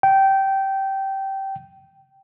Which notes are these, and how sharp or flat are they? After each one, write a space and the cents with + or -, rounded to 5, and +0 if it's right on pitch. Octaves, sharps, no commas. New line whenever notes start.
G5 -15